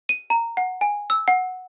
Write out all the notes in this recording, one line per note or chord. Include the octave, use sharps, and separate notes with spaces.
D#7
A#5
F#5
G#5
E6
F#5